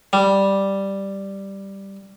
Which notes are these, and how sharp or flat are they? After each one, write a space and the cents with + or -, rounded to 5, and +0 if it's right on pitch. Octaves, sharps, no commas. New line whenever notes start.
G3 +0